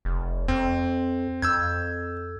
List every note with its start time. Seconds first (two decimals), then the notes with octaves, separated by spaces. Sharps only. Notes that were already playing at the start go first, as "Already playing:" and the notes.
0.05 F1
0.48 F2 C4
1.42 F2 E6 G6 G#6